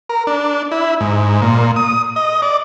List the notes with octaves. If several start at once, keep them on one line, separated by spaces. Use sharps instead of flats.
A#4
D4
E4
G#2
A#2
D#6
D#5
D5